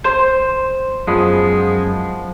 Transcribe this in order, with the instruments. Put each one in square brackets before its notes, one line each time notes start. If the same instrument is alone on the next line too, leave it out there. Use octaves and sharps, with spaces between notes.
[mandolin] C5
[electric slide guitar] F#2 [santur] F3 B3 F#5 [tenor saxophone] G#3